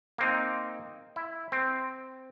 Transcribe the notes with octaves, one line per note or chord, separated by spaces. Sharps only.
A#3 C4 D#4
E4
C4